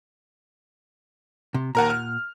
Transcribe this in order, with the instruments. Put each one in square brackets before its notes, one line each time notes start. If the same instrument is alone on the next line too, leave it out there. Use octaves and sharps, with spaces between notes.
[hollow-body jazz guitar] C3
[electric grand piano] D#2 A#4 A#5 [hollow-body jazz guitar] A#2 F#5
[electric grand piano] F6